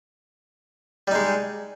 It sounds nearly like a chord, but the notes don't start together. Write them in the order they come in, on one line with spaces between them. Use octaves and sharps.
G3 D#4 G#3